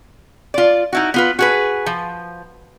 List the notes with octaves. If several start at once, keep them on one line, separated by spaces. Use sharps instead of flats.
F4 D5
D#4 E4 F#4
B3 F4 B4
F#4 G#4 B4
F3